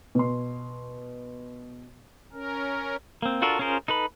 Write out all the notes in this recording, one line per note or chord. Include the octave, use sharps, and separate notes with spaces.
B2 C6
C#4 A#4
A#3 C4
D4 F4 F#4 A4 A#4
C#4 F4 G#4 A#4 C5
D#4 A4 B4 B5